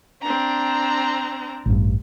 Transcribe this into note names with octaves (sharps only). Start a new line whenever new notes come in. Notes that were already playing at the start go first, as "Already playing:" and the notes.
C4 D4 A#5
A1 G2